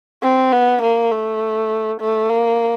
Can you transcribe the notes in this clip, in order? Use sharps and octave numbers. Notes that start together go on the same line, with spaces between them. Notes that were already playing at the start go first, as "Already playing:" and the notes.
C4
B3
A#3
A3
A3
A#3